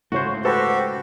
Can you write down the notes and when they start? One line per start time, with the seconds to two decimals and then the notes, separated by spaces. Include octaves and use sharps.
0.12 G#2 C#3 A3 E4 F#4 C5 C#5
0.45 F#4 G4 A4 B4 C5 A5